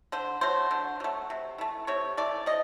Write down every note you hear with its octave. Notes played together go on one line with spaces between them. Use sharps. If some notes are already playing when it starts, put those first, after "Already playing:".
D3 C5
F#3 A3 C5
D3
F#3 A3
C3
E3 A3
C3 C#5
E3 A3 D5
C3 D#5